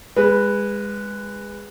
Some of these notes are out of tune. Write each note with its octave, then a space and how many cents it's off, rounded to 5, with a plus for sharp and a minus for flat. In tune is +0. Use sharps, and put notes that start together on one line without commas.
G#3 -20 B4 +0